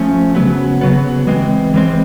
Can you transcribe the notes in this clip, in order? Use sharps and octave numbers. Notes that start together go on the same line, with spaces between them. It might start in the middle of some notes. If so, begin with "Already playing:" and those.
Already playing: F3 A3 C#4
C#3 F#3 B3
C#3 F#3 B3
E3 G#3 C4
E3 G#3 C4